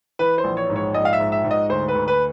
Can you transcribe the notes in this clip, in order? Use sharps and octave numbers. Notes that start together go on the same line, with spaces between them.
E3 B4
C5
A#1
C#5
G#2
C#5
A#1 D#5
F5
E5
G#2
E5
G#2
D#5
D2 C5
B4
D2
B4